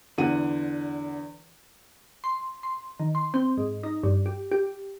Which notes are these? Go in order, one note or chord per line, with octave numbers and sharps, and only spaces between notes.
E2 D3 F#5 D#7
C6
C6
D#3
C6
C4
G#2
D#4
G2
G4
G4